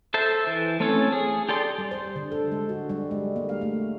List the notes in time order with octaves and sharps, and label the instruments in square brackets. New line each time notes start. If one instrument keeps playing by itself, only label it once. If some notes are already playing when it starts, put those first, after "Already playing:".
[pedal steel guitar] A4 C5 E5 A5
E3
A3 C4 C#4 A4 C#5
G#4
G4 A4 D5 C6
[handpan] G3
C5
D3
A4
G#3
F#4
G3
G#3
A#3
F5
A3